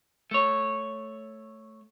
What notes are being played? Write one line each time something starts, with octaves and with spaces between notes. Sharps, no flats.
A3 C#5